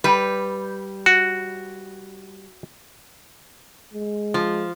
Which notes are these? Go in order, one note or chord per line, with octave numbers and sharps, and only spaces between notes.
G3 B4
F#4
G#3
F3